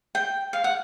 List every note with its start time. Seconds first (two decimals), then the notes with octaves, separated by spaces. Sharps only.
0.15 G5
0.53 F5
0.64 F#5